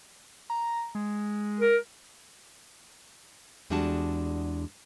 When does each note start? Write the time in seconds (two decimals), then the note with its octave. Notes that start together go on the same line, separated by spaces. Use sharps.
0.50 A#5
0.95 G#3
1.60 A#4
3.70 E2 G3 G#3 D4 F#4 A5